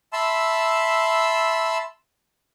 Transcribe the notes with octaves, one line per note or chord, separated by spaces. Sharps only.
E5 A5 B5 C6 E6